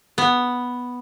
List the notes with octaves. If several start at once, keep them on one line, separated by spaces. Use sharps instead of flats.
B3